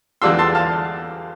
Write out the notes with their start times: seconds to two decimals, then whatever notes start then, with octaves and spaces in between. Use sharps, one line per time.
0.22 E2 D3 G3 D4 F4 C6 E6
0.39 A5 C6
0.55 F5 A5